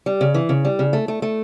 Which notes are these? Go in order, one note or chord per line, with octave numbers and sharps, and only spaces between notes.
G3
C#3
E3
C#3
G3
C#3
A3
A3
A3